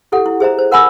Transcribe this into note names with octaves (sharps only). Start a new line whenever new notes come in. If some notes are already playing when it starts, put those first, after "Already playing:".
E4 G4 A4 F#5
E4
G#4 C5 E5 A#5
C5
A#4 F#5 G#5 B5 E6